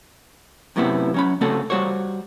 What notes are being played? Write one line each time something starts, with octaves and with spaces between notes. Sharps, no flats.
F#2 A2 C3 B3 E4
F#3 C#4 B5
C#3 A3 C4 C#4 F#4 A4
G3 F#4 C5 C#5